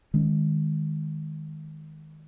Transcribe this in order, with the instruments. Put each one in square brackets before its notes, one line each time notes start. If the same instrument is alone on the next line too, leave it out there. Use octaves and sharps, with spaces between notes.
[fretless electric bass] D#3 G#3 C#4